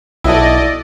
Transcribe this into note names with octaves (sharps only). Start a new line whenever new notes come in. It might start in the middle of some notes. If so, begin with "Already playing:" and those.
B1 E4 F#4 A4 D5 D#5